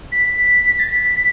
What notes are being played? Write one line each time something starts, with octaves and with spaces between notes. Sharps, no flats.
B6
A6
B6